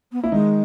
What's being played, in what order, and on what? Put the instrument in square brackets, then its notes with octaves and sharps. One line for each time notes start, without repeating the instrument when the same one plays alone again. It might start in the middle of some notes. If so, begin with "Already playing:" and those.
[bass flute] B3
[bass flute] A#3 [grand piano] E4
[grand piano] D#3 D#4 [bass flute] G#3